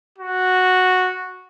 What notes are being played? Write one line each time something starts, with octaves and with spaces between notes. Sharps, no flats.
F#4